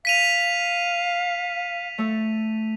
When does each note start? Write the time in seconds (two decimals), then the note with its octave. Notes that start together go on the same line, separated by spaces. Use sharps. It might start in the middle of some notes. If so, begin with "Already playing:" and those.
0.05 F5 B6 D#7 F7
1.98 A3 A4